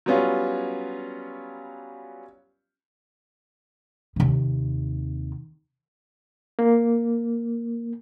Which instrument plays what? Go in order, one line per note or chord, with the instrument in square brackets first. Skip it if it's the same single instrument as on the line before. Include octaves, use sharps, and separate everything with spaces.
[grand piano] F#3 G3 B3 C#4 F4
[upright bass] D#2 C3
[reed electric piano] A#3